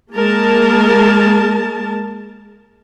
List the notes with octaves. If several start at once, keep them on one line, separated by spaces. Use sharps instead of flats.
G#3 A#3 A#4 A5